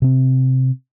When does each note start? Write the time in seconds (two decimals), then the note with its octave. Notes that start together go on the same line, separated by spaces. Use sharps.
0.02 C3 C4